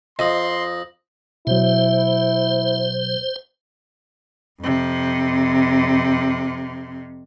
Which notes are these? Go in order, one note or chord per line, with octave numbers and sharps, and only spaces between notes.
F2 D#5 C6 D#6 A#6
B2 F#3 E4 C5
F2 C3